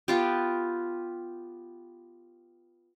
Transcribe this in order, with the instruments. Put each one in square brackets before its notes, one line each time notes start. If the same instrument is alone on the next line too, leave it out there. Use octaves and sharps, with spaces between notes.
[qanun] B3 F4 G4